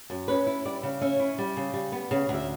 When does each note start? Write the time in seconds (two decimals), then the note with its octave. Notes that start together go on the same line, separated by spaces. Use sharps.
0.10 F#2
0.28 C#4 B4
0.47 E4
0.65 G3 D5
0.83 C#3
1.02 C#4 E5
1.20 E4
1.38 G3
1.57 C#3
1.74 G3
1.92 B3
2.11 C#3
2.29 D2
2.35 E5